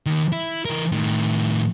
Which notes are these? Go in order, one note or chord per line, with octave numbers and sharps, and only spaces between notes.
D#2 D#3
E4
E3 A#4
A2 D#3